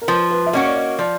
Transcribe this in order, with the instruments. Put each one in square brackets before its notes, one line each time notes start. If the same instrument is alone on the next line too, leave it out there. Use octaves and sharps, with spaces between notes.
[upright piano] A#4
[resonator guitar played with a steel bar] F3 [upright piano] B4
[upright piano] B4
E5
[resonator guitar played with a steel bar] A#3 C#4 F#4 [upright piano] D#5
[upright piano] D5
D#5
[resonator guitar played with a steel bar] F3 [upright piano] D5